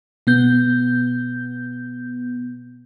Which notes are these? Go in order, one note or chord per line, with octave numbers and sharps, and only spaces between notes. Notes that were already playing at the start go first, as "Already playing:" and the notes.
B2 B3 G6